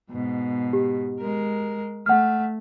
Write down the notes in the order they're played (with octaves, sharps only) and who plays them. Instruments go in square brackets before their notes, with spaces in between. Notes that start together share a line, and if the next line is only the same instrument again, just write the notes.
[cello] G#2 B2
[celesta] G4
[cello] G#3 A#4
[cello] A3 [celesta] F#5 F6